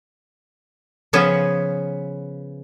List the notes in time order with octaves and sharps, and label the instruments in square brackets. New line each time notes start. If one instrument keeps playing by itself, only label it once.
[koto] C#3 F3 B3 C#4 C#5